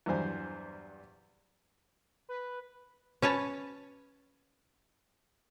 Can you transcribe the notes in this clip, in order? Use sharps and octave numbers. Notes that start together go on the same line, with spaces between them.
E2 G2 F#3 G3 C5 G#5
B4
C#4 B4 C#5 A5